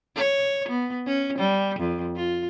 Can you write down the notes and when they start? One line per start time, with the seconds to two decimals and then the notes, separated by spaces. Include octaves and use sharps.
0.16 C#5
0.68 B3
1.06 C#4
1.38 G3
1.79 F2
2.16 F4